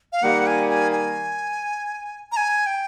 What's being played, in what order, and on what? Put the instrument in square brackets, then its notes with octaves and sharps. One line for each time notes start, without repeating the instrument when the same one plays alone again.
[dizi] F5
[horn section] D#3 G3 A#3 [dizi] F#5
[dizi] G#5
G#5
G#5
A#5
G#5
G5